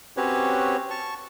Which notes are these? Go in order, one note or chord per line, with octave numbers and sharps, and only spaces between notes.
C4 C#4 F#4 G4 B4 C#5
A5 C#6